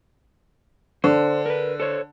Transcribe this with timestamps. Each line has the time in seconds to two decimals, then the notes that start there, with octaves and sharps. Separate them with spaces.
1.04 D3 C5
1.46 A#4 B4
1.80 A4 C5 C#5